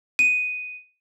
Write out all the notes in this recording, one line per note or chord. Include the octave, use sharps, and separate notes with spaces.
D#7